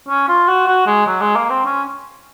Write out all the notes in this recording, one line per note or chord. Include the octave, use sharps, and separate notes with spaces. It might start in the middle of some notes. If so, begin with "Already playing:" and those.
C#4
F4
F#4
F#4
G#3
F#3
G#3
A#3
C4
C#4